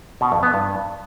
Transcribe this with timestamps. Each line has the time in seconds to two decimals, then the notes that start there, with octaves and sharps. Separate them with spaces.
0.21 B2
0.32 F2
0.43 B3
0.54 G2